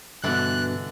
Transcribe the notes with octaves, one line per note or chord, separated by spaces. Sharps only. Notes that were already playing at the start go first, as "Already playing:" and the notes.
G2 B2 D3 E3 D4 F#6